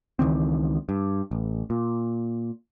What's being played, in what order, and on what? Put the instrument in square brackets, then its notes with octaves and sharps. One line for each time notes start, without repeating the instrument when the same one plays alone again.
[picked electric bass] C#2 D#3 E3 C4
G2
A1
A#2